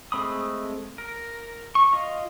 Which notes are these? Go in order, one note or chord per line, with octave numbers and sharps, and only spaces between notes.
G#3 A3 C4 B5 D#6
A#4
C#6
F4 D#5 F5